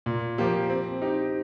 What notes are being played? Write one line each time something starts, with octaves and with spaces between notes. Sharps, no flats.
A#2
F3 A#3 G4
C4
D#4 G4